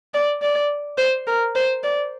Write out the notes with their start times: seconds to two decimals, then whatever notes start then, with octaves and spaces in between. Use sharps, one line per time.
0.14 D5
0.42 D5
0.98 C5
1.27 A#4
1.55 C5
1.83 D5